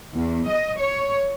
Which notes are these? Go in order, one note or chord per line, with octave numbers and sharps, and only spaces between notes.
E2
D#5
C#5